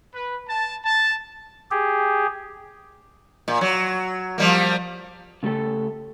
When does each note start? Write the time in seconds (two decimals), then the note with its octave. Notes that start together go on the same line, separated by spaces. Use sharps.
0.15 B4
0.48 A5
0.85 A5
1.71 G4 G#4
3.48 A#2
3.61 F#3
4.38 F3 G3 A#3
5.43 C#3 A3 G4 A4